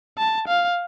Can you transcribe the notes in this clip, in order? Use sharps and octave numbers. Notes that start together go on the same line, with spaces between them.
A5
F5